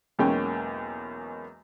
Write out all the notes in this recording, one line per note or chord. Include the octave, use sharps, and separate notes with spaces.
B1 E2 G#3 A#3 C#4 G5